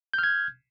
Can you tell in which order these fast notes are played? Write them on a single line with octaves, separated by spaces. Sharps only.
G6 F6 G#6